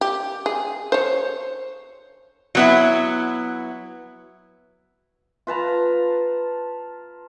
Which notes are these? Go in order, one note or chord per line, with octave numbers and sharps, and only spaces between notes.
G4
G#4
C5 C#5
F#3 B3 E4
F4 B4 A5 A#5